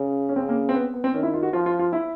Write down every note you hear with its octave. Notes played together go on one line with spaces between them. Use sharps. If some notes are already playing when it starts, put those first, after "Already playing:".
Already playing: C#3
C#4
C#3 C4
A#3
C4
B3
B3
C4
D#3 C#4
E4
F4
F#4
F3 F4
F4
F4
E4